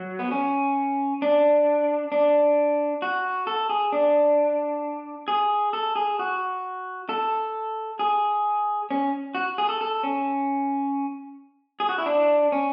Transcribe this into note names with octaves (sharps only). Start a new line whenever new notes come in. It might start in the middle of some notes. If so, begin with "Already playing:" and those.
Already playing: F#3
B3
C#4
D4
D4
F#4
A4
G#4
D4
G#4
A4
G#4
F#4
A4
G#4
C#4
F#4
G#4
A4
A4
C#4
G#4
F#4
E4
D4
C#4